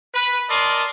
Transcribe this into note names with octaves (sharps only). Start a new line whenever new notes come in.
B4
A#4 D5 D#5 A5 C6